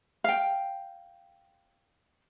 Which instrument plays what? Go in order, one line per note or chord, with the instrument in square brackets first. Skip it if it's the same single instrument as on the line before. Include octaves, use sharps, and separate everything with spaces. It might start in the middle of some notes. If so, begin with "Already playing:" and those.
[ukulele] F5 G5